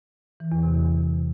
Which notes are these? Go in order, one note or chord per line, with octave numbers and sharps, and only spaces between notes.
E3
E2
C3
C3